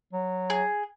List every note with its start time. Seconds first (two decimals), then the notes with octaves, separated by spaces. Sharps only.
0.13 F#3
0.50 G#4